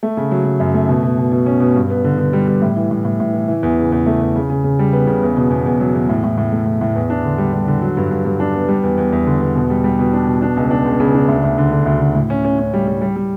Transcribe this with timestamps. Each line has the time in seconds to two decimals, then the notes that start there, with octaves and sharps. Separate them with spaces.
0.03 A3
0.17 C#3
0.31 F#3
0.45 F#3
0.60 F#2
0.74 A3
0.88 B2
1.03 B2
1.18 B2
1.32 B2
1.46 C#4
1.60 B2
1.75 G2
1.90 B3
2.04 D3
2.19 D3
2.33 G3
2.47 G3
2.62 A2
2.76 E3
2.91 A2
3.05 A2
3.20 A2
3.34 E3
3.48 E3
3.63 E2
3.77 C#3
3.92 E2
4.06 A3
4.21 E2
4.35 C#3
4.50 C#3
4.64 C#3
4.79 G3
4.93 B3
5.07 C#3
5.23 E2
5.37 B2
5.50 E2
5.66 E2
5.80 F#3
5.94 E2
6.09 A2
6.24 A2
6.38 A2
6.53 A3
6.66 A2
6.81 A2
6.95 E2
7.10 D4
7.24 D3
7.38 G3
7.54 G3
7.68 D3
7.82 F#3
7.97 G2
8.11 G2
8.25 G2
8.40 D4
8.54 B3
8.69 G3
8.83 E2
8.98 E2
9.12 E2
9.26 D3
9.42 E2
9.56 B2
9.70 G3
9.84 G3
9.99 B2
10.13 D4
10.27 B2
10.42 D4
10.57 C#2
10.71 D4
10.85 C#2
11.00 C#3
11.15 D4
11.28 D2
11.44 D2
11.58 D3
11.72 D3
11.86 D2
12.01 D3
12.15 A2
12.30 C#4
12.44 C#4
12.59 C#4
12.74 G3
12.87 G3
13.01 G3
13.16 G3